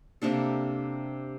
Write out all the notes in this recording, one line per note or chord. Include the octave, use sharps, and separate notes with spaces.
C3 A#3 D4 A4